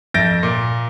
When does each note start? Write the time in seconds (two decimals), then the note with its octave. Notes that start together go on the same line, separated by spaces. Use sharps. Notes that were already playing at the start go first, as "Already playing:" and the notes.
0.14 F2 E5 G6 A6 A#6 D7
0.43 A#2